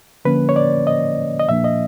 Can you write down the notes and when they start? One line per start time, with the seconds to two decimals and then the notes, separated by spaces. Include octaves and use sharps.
0.25 D3 F3 A#3 C#4 B4
0.49 C#5
0.56 D5
0.87 D#5
1.39 D#5
1.49 A#2 F3 A#3 D4 E5
1.64 D#5